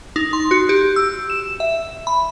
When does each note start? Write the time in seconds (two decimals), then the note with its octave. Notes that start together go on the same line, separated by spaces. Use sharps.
0.16 D#4
0.33 C6
0.51 F#4
0.69 G4
0.96 E6
1.30 E7
1.60 E5
2.07 B5